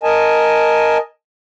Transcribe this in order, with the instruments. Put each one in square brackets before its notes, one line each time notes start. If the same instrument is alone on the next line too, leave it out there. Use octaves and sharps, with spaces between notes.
[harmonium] A#4 D#5 G#5 A5